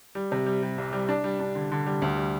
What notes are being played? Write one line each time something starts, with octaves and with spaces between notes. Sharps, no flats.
G3
C3
G3
G3
C2
G3
D4
G3
D4
D3
D3
G3
D2
G3